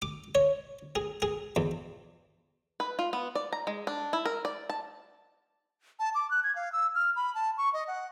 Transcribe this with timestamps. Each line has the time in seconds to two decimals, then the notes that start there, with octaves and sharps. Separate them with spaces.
0.02 D6
0.35 C#5
0.96 G#4
1.22 G#4
1.56 E2
2.80 B4
2.99 F4
3.13 B3
3.35 D5
3.52 A#5
3.67 G#3
3.87 D4
4.13 E4
4.25 A#4
4.45 D5
4.70 A5
5.99 A5
6.15 D6
6.31 F#6
6.44 G#6
6.56 F5
6.73 E6
6.95 F6
7.16 B5
7.35 A5
7.58 C#6
7.73 D#5
7.88 F#5